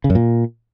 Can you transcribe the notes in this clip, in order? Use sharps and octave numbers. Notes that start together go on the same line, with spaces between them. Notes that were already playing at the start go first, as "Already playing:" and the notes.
C#3
F#2
A#2